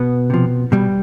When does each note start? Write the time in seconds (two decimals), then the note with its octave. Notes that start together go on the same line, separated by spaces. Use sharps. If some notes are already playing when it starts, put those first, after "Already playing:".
Already playing: B2 B3
0.30 C3 F3
0.72 B2 G3